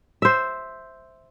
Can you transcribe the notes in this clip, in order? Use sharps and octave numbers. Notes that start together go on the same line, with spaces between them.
C5 E5